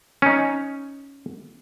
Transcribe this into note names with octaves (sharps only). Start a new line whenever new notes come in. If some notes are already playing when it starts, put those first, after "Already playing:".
C#4 D#4